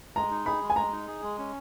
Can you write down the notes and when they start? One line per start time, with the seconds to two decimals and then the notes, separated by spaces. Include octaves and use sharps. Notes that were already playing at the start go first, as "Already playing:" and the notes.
0.16 G#3 A#5
0.31 D#4
0.46 G#4 B5
0.62 G#3
0.70 G#5
0.76 G#3 A#5
0.92 D#4
1.07 G#4
1.23 G#3
1.38 C#4